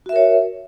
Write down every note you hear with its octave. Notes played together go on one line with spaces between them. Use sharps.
F#4 A#4 C#5 E5